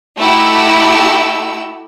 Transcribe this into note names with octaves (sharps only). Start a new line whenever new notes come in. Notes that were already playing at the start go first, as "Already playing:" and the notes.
A3 D#4 E4 F#4 G4 E6